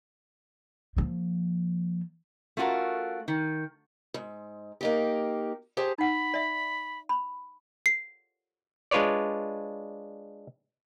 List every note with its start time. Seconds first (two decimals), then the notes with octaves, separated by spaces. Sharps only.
0.97 F3 A#3
2.57 A3 C#4 F4 F#4 A#4
3.28 D#3
4.14 G#2
4.81 A#3 D#4 G4
5.77 G4 G#4 C5 A5
5.98 D#4 F#5 B5
6.34 D5 E5
7.09 B5
7.86 C7
8.91 G#3 D4 F4 B4 C#5 D5